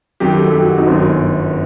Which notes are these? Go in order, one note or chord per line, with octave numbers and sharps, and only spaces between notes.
F#2 D#3 F#3 G4
A4
G4
F#4
D#4
G1 F#2 D#3 B3